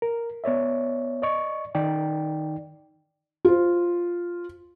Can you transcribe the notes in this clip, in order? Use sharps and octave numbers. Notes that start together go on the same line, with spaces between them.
A#4
B3 C#5 D5 E5
D5 D#5 C#6
D#3 D#4 D5 G5
F4 C5